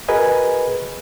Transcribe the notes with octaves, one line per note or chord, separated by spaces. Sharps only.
F#4 G#4 A#4 B4 D#5 G#5